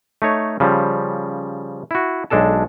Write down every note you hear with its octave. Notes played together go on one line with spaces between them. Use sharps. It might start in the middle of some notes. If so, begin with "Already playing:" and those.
A3 D#4 C#5
C#3 F3 G3
E4 F#4
B1 G#3 D4 A4 A5